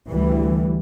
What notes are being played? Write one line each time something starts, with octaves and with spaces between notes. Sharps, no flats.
D2 E3 G3